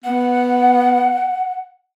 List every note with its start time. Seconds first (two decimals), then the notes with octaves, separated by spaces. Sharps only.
0.04 B3 F#5